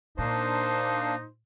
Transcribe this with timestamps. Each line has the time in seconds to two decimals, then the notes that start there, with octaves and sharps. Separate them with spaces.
0.18 A#2 A#3 D4 D#4 C5